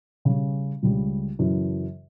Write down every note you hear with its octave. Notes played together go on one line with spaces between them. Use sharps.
C#3 G3 C#4
C#2 C#3 G3
F#2 C#3 E3